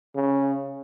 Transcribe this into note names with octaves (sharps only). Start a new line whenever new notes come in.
C#3